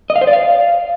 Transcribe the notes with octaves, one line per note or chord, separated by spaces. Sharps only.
D#5
F5
C5
D5
F5